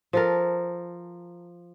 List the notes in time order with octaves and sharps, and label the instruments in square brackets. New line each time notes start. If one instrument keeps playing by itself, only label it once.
[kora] F3 A4 A#4